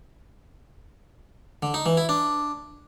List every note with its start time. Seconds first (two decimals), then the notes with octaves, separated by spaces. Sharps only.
1.63 D3
1.74 D#4
1.86 E3
1.97 E4
2.09 D4